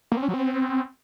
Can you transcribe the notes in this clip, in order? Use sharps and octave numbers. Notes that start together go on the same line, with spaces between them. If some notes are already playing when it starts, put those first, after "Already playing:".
A#3
C4
C#4
F#3
C4